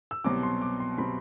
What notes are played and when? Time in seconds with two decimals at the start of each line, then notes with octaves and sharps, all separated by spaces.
0.11 E6
0.24 C2 B2 F#3 C4 D6
0.43 C6
0.61 D6
0.80 C6
0.98 B2 F#3 C4 B5